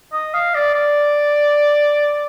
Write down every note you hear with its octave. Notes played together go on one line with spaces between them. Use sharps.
D#5
F5
D5
D5